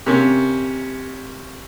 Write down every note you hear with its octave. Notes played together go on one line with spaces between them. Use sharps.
C3 A#3 C#4